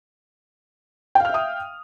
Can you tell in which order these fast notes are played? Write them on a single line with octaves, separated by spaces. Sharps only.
G5 F5 F6 E5 D#6